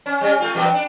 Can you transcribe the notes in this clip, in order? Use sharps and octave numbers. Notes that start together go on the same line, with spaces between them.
C#4
G3 C#4
A3 F4
E2 G2 B2
D4